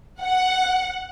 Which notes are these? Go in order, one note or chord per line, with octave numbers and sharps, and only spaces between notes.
F#5